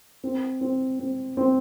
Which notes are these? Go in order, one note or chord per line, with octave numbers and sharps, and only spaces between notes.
C4
C4
C4
C4